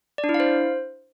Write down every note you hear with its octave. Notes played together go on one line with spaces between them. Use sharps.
D5
D4
E4
F5
C5